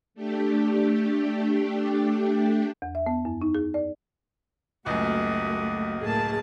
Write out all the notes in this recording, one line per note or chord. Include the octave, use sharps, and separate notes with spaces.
A3 D4 G4
E2
E5
B3
F#2
D#4
G#4
D5
C#2 F#2 A3 A#3 F#4 G4 D#5
A2 A#3 G#4 A5